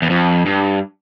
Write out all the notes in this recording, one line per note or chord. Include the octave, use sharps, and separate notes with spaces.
E2
F2
G2